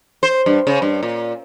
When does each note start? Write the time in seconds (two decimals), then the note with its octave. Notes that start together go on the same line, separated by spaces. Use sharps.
0.23 C5
0.46 G2
0.67 C#3
0.82 G2
1.03 A#2